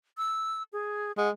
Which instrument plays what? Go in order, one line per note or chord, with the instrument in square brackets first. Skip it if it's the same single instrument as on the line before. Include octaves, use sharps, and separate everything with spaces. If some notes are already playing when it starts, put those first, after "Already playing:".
[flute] E6
G#4
[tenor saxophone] G#3 [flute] F#5